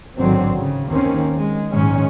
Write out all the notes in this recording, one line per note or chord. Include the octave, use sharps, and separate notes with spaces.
A1 G#2 D3 D#3 F#3 C4
C#3
D#2 D#3 A#3 C4 C#4
G#3
A#1 G#2 D#3 G#3 C#4